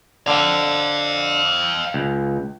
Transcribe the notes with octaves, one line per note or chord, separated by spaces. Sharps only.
D3 F5 G5
C#2